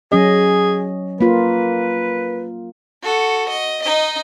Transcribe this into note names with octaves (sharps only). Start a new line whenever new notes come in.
F#3 C#4 G#4 D#5
A#3 F4 B4
F#4 A4
D#5
D#4 D#5